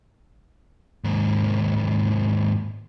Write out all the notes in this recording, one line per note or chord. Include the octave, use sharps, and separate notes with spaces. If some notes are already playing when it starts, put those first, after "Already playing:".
D#2 G#2